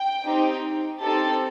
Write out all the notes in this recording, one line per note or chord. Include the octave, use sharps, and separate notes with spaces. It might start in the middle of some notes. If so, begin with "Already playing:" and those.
Already playing: G5
C4 D#4 G4
C4 D#4 G4 A4 A5